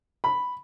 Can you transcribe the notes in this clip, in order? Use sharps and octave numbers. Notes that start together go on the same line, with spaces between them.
B5